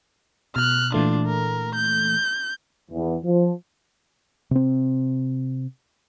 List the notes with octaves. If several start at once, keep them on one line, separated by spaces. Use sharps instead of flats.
B2 F6 F#6
A#2 E3 A3 D4 F4
A#4
G6
E2
F3
C3 C4